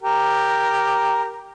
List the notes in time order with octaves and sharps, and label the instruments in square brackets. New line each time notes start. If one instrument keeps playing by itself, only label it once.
[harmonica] G4 A#4